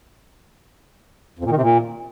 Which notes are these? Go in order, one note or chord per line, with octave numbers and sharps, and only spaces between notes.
F2
A#2
D#3
C3
A#2